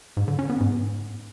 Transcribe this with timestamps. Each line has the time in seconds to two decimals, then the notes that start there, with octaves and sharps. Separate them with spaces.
0.17 G#2
0.28 D3
0.39 C#4
0.50 B3
0.60 G#2